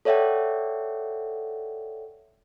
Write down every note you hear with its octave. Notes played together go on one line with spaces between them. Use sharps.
A4 C#5 D5 E5 F#5 G5